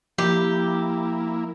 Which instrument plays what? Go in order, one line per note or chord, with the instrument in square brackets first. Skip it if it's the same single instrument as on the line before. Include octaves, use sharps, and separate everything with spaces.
[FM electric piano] F3 [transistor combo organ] A#3 E4 [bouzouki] G4